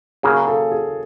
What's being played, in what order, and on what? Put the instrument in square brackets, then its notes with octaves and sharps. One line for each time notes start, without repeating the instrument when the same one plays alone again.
[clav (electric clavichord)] C#3 F#3 A#3 [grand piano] G#4
[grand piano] A4
G#4